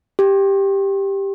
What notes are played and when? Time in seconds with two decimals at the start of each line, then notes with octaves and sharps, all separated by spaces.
0.19 G4